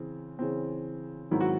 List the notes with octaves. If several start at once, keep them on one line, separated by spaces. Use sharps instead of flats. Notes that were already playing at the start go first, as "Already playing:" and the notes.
Already playing: C#3 E3 C4
C#3 E3 C4
G#2 D#3 F#3 C4 E4
F#4